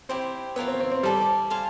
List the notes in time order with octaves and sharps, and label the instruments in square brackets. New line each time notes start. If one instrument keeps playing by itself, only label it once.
[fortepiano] C4 [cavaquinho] E4 G4 C5
[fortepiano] B3 [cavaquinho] F4 A#4 C#5 E5
[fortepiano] C4
C4
C4
[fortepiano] G3 [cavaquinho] E4 A4 D5
[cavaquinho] A4 C5 F5 G#5